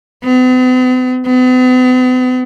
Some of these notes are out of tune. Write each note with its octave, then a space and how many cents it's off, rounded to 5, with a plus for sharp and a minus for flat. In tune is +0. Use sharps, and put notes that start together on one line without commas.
B3 +45
B3 +45